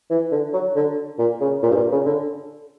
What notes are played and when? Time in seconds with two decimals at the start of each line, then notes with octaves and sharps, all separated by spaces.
0.10 E3
0.32 D3
0.53 F#3
0.76 D3
1.19 A#2
1.41 C#3
1.63 A#2
1.71 G2
1.77 A#2
1.92 C#3
2.06 D3